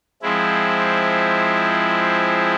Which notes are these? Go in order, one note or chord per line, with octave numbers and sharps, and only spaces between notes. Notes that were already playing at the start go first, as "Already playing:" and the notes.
F3 G#3 C4 E4